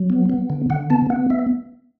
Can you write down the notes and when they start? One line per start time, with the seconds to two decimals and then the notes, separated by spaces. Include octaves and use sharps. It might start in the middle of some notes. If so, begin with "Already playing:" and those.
Already playing: F#3
0.10 B3
0.30 B3
0.50 D3
0.70 D3 F#5
0.90 B3 A5
1.10 B3 F#5
1.30 B3 E5